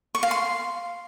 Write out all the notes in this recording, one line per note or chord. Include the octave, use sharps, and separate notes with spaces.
C#6
F5
C6